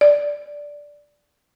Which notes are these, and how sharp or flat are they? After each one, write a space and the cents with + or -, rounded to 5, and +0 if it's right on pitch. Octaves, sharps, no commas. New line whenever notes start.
D5 -5